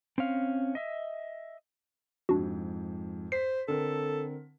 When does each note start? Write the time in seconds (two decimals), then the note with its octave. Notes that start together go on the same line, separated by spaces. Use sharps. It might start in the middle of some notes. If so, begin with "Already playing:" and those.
0.18 C4 C#4 F5
0.75 D#5 E5
2.29 F2 G#2 D4 F#4
3.32 C5 B6 C7
3.68 D3 C4 A4 A#4